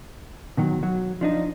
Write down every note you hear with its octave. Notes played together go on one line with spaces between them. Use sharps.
B2 D#3 F#3
F#3
F3 D4 D#4